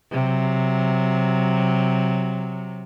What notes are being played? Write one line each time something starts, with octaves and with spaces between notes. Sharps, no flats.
C3 F#3